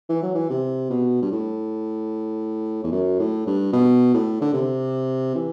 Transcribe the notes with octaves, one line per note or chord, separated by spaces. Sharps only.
E3
F#3
E3
C3
B2
G2
A2
E2
F#2
A2
G2
B2
A2
D3
C3
E3